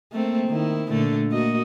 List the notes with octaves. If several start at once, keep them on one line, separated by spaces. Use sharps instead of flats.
A3 A#3 C4
D#3 E4
A#2 D3 A3
A#3 F#4 D#5